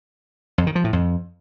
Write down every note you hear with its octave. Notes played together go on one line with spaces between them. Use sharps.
F2
D#3
F3
A2
F2